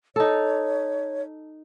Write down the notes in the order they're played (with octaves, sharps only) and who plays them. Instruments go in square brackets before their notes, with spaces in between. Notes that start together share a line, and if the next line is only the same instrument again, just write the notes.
[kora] D#4 A4 [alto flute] C#5